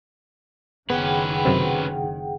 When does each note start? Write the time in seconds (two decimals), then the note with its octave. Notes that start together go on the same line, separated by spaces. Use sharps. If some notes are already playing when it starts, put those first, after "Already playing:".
0.90 F#1 D#3 B3 C#4 G#4 B4 F#5 G5
1.45 F#2 C3 C4